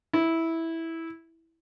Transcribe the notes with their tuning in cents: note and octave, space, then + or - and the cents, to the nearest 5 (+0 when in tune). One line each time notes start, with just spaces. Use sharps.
E4 -10